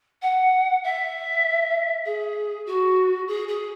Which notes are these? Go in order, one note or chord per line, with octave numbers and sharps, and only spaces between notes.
F#5
E5
G#4
F#4
G#4
G#4